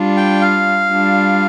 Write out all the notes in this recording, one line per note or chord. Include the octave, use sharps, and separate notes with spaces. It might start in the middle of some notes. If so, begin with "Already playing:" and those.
Already playing: G3 D4 F4
G5
F5
G3 D4 F4